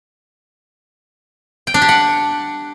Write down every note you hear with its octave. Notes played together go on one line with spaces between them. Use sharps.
G5
D4
G4
F#5